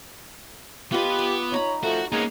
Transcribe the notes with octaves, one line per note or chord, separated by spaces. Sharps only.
B3 F4 G4 B4 D#5
D6
D#4 C#5 A#5 B5
F3 A3 F#4
G#3 A#3 B3 C#4 D#4